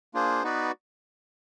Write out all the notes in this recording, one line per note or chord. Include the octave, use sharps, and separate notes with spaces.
A#3 D4 F4 G#4 C5
B3 D#4 F#4 B4 D5